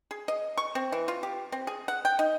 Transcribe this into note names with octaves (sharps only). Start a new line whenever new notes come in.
G#4
D#5
C#6
C4
E3
F4
G4
C4
G#4
F#5
G5
D#4